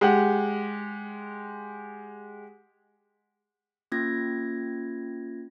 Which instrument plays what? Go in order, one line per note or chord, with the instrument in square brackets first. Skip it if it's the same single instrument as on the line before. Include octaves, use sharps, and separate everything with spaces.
[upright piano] G#3 G4 F#5
[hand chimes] A#3 C#4 F4 G#6 A#6